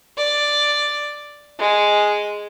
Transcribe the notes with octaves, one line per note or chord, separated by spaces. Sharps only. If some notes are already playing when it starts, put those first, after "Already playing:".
D5
G#3